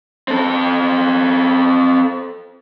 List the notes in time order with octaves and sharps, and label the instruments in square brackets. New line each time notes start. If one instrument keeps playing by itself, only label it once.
[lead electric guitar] C4 A4